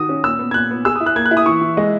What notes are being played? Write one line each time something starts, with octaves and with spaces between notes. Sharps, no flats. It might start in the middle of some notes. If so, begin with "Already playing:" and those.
Already playing: D#3 F#4 D#6
C#4
A#2 E6
B3
G#6
A#2 F#6
B3
G#4 E6
E4 D#6
F#6
A#3 G#6
F#6
E4
D#6
E3 C#6
E3
G#3 D#5